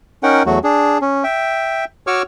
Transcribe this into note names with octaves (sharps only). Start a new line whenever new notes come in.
C#4 D#4 A#4 F#5 G5
E2 F#3 A3 F#4
D4 G#4
C#4
E5 G5
F#4 C#5 C#6 D6 E6 F6